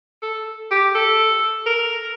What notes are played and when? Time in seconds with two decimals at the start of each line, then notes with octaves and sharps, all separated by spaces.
0.22 A4
0.71 G4
0.95 A4
1.66 A#4